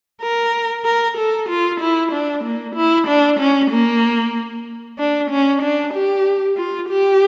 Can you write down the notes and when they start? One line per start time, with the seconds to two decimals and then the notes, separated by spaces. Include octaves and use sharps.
0.21 A#4
0.85 A#4
1.17 A4
1.49 F4
1.80 E4
2.12 D4
2.44 A#3
2.75 E4
3.07 D4
3.39 C#4
3.71 A#3
4.98 D4
5.30 C#4
5.62 D4
5.93 G4
6.57 F4
6.89 G4